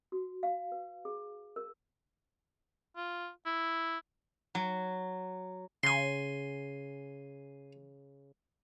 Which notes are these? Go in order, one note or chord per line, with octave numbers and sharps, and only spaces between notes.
F#4
F5
B4
G#4
A#4
F4
E4
F#3
C#3 G#5 C6